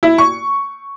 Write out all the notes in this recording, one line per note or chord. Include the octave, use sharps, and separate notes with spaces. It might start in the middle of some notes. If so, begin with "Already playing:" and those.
E4
C#6